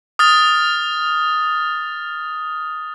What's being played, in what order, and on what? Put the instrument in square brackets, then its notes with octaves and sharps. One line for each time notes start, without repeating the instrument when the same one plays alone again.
[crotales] D#6 F6 A6